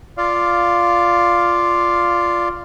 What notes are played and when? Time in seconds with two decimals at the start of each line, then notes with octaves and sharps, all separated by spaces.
0.17 F4 D5 F5